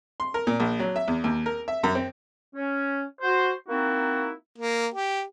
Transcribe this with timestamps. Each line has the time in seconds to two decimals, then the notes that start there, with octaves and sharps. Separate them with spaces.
0.20 C6
0.34 A#4
0.47 A#2
0.60 A#1
0.80 F#3
0.96 E5
1.08 E2
1.24 D#2
1.46 A#4
1.68 E5
1.83 F#2
1.95 C4
2.55 C#4
3.21 F#4 C5
3.69 A#3 C4 D#4 E4 F#4
4.58 A#3
4.94 G4